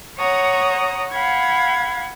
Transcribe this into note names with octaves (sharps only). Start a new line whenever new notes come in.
C#5 F#5 A#5 D#6
F5 F#5 B5 G#6